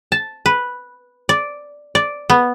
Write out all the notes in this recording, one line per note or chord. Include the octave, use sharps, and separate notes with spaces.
A5
B4
D5
D5
B3